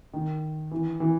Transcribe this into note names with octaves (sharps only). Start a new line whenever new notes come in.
D#3
E3
E3